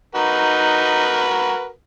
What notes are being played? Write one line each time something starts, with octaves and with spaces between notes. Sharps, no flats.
D#4 F#4 A#4 B4